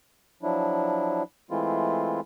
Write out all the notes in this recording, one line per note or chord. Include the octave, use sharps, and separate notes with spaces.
F3 F#3 D4 E4
E3 G#3 A3 C4 E4 F4